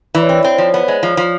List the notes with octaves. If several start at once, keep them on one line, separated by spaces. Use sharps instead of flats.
E3 D5
C#5
C4 D5
C#5
C4
C5
F3 C#5
B3
C5
G#3
F3
F3